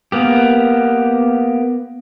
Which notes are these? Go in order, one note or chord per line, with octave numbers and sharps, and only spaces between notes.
A#3 B3 G4